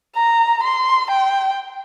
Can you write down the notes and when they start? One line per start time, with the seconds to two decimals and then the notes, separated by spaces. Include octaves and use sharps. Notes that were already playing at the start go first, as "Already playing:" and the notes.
0.16 A#5
0.64 C6
1.11 G5